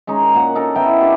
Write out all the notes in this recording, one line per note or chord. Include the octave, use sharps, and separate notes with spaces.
G#3 C#4 D#4
A#4
A#2 F#5
D#4 A4 A#4
B3 D#4 E4 G5
D4 G4